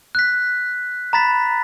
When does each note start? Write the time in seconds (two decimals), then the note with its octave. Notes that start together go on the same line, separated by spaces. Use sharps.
0.15 F#6 B6
1.13 A#5 B5 A6 B6